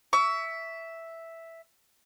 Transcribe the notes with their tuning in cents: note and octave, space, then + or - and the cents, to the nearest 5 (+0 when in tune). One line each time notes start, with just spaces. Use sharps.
E5 +0 C#6 +30